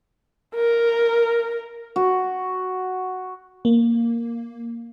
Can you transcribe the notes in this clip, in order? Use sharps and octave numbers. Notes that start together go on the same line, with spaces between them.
A#4
F#4
A#3